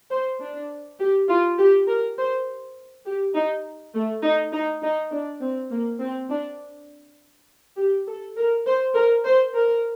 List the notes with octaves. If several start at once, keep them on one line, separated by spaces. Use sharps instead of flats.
C5
D4
G4
F4
G4
A#4
C5
G4
D#4
A3
D#4
D#4
D#4
D4
C4
A#3
C4
D4
G4
A4
A#4
C5
A#4
C5
A#4